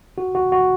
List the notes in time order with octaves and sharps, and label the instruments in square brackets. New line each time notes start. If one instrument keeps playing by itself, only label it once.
[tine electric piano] F#4
F#4
F#4